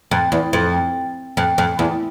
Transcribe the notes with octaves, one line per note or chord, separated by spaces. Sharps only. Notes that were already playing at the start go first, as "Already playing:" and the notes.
F2
E2
F2
F2
F2
E2